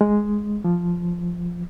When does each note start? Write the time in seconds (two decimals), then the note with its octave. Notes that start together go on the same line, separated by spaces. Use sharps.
0.01 G#3
0.64 F3